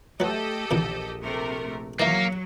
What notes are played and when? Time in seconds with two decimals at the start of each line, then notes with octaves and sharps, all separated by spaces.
0.20 F#3 A3 G4 A4 B4 D#5
0.71 A#1 E2 B2 D#3
1.22 C3 A3 A#4
2.00 D#3 E3 F#3 A#3 D#4